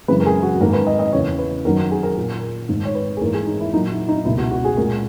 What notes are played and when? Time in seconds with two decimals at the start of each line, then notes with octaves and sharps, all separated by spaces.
0.08 F#2 C#3 E3 G#3 B4
0.20 A#4
0.26 G#4
0.43 F#4
0.61 G#2 D#3 A#3 A#4
0.73 B4
0.87 D#5
0.99 D#5
1.12 E2 C#3 E3 C#5
1.39 B4
1.65 F#2 D#3 F#3 A#3 A#4
1.91 G#4
2.03 A#4
2.17 A#2 A#3
2.69 G#2 D#3 A#3
2.85 C#5
2.95 B4
3.17 G#4
3.21 G#2 E3 A#3 A#4
3.34 G#4
3.47 D#4
3.60 E4
3.73 A#2 F#3 A#3 D#4
3.91 E4
4.08 D#4
4.25 C#2 B2 A#3 E4
4.38 F#4
4.51 F#4
4.65 G#4
4.77 A#2 G#3 A#4